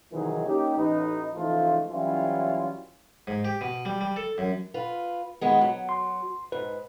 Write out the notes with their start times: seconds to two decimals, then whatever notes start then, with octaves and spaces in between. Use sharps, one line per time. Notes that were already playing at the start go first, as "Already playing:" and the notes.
0.13 C2 D#3 E3 F#3 D#4 G#4
0.46 A#3 C#4 D#4 G4
0.76 A1 D#4 B4
1.34 C#2 E3 F3 A3 D#4 F4
1.90 E3 F#3 G3 C#4 E4 F4
3.27 G#2
3.45 G4
3.61 B2
3.85 G3
4.01 G3
4.16 A4
4.38 F#2
4.74 F4 B4
5.41 D#3 G#3 B3
5.61 F#3
5.89 C6
6.52 G#2 B4